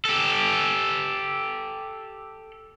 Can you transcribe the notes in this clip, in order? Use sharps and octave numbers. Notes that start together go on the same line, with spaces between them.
G4 A4